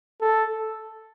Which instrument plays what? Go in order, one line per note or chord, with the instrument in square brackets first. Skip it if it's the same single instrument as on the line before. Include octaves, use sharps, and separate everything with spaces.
[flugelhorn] A4